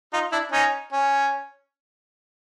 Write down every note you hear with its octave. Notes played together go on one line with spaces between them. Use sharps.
D#4 F4
D4 E4
C#4 D#4
C#4